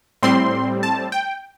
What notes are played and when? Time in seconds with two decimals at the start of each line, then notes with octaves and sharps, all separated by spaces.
0.23 A2 G3 C4 C6
0.83 A5
1.12 G5